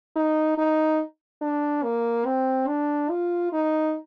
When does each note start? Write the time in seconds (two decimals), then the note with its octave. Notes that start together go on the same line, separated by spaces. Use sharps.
0.16 D#4
0.58 D#4
1.42 D4
1.83 A#3
2.26 C4
2.68 D4
3.10 F4
3.53 D#4